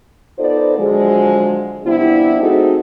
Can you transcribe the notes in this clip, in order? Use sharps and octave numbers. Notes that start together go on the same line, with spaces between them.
B3 D#4 F4 A4 C5 D5
D3 F3 F#3 G#3
C3 F3 G3 B3 D4 E4
A3 C4 D#4 F#4 G#4 A4